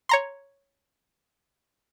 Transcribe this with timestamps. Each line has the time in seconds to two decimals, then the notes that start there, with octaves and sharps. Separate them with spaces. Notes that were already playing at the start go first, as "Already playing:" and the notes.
0.09 C#5 A#5 C6